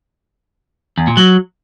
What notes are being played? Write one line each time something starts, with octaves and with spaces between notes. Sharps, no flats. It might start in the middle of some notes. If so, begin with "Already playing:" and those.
E2
A#2
F#3